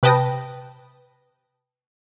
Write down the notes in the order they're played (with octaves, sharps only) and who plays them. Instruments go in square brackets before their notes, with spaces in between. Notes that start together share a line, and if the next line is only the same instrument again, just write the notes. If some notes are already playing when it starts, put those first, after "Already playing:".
[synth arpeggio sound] C3 B4 G5 A5 D#6 A#6